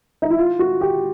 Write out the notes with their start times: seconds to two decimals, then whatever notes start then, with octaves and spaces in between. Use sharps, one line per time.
0.22 D#4
0.30 E4
0.38 F4
0.59 F#4
0.81 G4